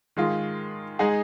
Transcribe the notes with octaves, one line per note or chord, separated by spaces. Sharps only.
D#3 G#3 F4
G#3 D#4 G#4